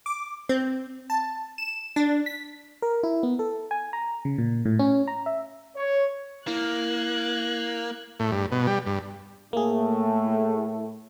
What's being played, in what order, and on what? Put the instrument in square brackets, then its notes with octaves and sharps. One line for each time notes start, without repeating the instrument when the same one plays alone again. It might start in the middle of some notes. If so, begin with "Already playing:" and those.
[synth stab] D6
C4
A5
E7
D4
B6
[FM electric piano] A#4
E4
B3
A4
G#5
A#5
C#3
A#2
A2
C#4
A#5
E5
[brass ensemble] C#5
[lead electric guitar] A#3 [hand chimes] E4 [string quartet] F#6 G#6
[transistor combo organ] A2
G2
B2
G3
G2
[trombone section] A2 A3 [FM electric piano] A#3 G#4